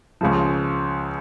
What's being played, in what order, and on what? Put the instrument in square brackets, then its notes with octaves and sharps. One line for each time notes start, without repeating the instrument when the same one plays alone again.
[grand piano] C#2 C#3 F3